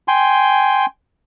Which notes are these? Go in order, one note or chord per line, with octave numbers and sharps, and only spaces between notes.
G5 G#5 C6